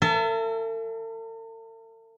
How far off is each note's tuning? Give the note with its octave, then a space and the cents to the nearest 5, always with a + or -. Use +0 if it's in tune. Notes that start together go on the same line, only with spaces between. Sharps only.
A4 +45 E5 +35 A5 -30